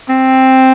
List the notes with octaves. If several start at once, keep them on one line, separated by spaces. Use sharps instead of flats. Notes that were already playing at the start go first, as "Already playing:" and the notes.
C4